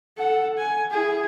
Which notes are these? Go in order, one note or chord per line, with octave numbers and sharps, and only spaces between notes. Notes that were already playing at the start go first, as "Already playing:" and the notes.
A4 F#5
G#5
E4 G#4